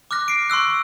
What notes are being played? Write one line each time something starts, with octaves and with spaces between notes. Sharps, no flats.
D6 F6 F#6 A#6
C7 D7
C6 C#6 E6 F#6